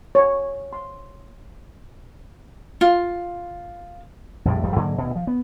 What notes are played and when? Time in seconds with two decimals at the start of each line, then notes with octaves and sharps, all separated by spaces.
0.15 C#5
0.73 C6
2.81 F4
4.45 A#1 F2 A2 G3
4.63 F1 G#2 F3 G3
4.76 G#2 D3 F#3 A#3
4.98 D2 B2
5.16 F3
5.27 B3